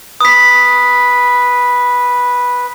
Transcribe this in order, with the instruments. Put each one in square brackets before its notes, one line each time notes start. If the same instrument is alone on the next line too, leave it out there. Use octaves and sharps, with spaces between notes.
[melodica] B4 [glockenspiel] D#6 B6